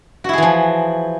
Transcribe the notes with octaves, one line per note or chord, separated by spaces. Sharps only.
E3 F3 E4 F#4 G#4